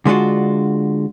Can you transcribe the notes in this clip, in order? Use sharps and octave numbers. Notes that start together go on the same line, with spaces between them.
D3 G#3 D4 F4 F#4